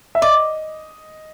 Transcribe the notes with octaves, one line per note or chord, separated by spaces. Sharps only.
E5
D5 D#5